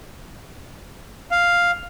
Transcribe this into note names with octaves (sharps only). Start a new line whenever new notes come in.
F5